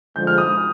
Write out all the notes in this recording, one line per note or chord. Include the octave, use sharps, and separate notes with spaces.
D3 F3 G#3 G6
F6
D#6